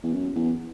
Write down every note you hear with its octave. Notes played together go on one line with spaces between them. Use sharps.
E2
F#2
E2